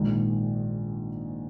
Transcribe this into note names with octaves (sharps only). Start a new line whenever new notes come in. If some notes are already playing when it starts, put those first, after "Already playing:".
Already playing: A#1 G#2 D#3